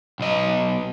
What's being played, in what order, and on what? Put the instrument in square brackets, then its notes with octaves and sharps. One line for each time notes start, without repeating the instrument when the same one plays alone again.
[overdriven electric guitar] B1 D#5